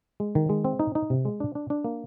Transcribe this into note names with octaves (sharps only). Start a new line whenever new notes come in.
G#3
D#3
G#3
C4
D#4
D#4
C3
G#3
D4
D4
D4
A#3